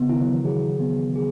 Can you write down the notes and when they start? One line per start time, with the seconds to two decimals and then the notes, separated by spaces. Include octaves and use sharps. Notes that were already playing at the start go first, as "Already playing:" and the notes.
Already playing: C#3 B3
0.09 D#3 E4
0.21 F#3
0.27 E3
0.45 F#3 G#4
0.80 B3
1.16 G#4